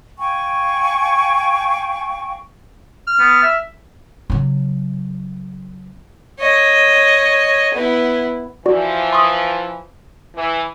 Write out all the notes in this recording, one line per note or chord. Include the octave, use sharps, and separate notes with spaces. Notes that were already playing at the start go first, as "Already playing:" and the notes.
F5 G5 G#5 C#6
F6
B3
E5
C#3 F#3
C#5 D#5
B3 E4
E3 F3 F#4 D5
C6 C#6 D#6
E3